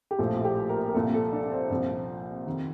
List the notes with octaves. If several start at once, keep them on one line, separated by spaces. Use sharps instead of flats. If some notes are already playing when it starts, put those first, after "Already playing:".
G4
A#1 A2 F3 A4
G4
A#4
A#4
C2 A#2 F3 A4
A4
D4
C4
C2 A#2 F3
F2 C3 D#3